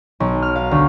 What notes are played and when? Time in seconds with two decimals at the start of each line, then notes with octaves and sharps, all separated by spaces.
0.20 B1
0.42 F6
0.56 F5
0.71 D2